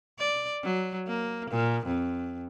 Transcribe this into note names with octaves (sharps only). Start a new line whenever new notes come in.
D5
F#3
A#3
A#2
F2